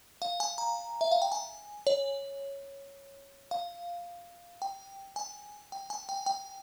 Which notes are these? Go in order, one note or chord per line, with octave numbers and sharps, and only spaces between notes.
F5
G#5
A#5
E5
F5
G5
G#5
C#5
F5
G5
G#5
G5
G#5
G5
G5